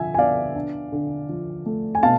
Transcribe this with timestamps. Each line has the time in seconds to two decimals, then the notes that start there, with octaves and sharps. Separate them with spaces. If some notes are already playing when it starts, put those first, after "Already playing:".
Already playing: D3 F3 E5 G#5
0.14 G#5
0.18 B3 D5 F5
0.56 D4
0.92 D3
1.29 F3
1.66 A3
1.95 G#5
2.03 B2 F5 A5